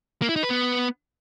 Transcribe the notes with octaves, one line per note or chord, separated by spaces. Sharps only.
A#3
E4
D#4
B4
B3